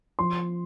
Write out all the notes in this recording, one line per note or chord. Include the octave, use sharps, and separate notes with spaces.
F3 C6